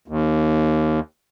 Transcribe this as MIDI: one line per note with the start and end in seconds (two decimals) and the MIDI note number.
0.08 1.00 39